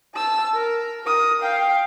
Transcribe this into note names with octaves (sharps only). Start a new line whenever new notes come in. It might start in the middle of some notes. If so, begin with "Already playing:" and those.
A5 E6
A#4
A#4 D#6
F5 G5